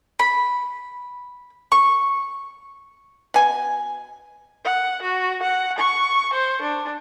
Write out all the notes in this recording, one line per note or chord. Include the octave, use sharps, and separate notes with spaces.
B5
C#6
B2 G#5
F#5
F#4
F#5
C#6
C5
D4